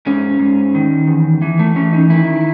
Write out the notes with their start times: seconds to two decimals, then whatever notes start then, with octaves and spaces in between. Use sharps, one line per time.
0.06 G#2 C#4
0.39 G#2
0.74 D#3
1.07 E2
1.42 E3
1.59 A3
1.76 E3 C#4
1.93 D#4
2.10 D#3 E4